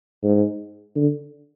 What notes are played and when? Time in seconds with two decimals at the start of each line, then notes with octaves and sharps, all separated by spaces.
0.23 G#2
0.96 D3